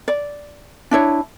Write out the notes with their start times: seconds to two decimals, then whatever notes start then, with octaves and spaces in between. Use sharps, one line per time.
0.08 D5
0.91 D4 E4 C#5